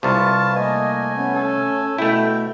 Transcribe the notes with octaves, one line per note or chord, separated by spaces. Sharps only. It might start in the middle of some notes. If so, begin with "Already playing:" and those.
C2 C3 F4 B4 A5 C#6
A3 A#3 D#5 G#5
B3 C#4
A4
B2 A3 E4 G5